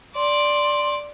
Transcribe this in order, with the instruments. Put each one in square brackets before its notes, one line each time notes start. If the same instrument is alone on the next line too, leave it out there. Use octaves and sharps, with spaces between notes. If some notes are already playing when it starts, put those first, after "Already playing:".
[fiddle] D5 [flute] C6